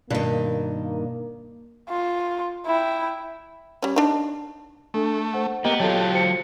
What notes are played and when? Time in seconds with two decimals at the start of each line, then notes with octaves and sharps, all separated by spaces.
0.10 G2 B2 D#3 A#3
1.89 F4
2.66 E4 G5
3.82 G3 C#4
3.96 D4 D#4
4.94 A3 D4 A4
5.34 C5 F#5
5.65 A#3 B3 G4 D#5
5.80 F#3 F4 G4 A4 C#5 A5
6.15 C5 C#7